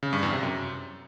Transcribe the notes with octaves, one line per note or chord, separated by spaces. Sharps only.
C#3
G2
E2
C3
F#2